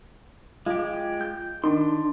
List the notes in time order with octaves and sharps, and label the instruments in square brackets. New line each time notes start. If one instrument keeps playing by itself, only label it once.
[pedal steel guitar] G#3 G4 [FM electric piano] F4
[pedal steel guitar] G6
[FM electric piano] D#3 [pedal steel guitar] D4 C6